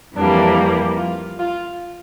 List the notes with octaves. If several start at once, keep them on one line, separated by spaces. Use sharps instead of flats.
F2 E3 G3 A#3 D4
F4
F4